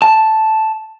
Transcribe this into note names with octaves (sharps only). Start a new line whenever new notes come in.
A5